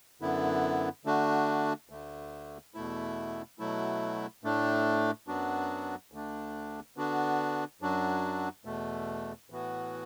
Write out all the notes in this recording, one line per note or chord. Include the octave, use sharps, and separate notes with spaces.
F#2 D3 B3 E4
D3 A3 D4 F#4
D2 D3 A3
E2 B2 A3 E4
B2 F#3 A3 E4
A2 A3 D4
F#2 F#3 B3 D4 F#4
D2 D3 A3 D4
D3 B3 D4 F#4
F#2 F#3 D4 F#4
E2 B2 A3
A2 E3 B3 F#4